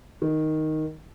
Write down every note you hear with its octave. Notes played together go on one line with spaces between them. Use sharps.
D#3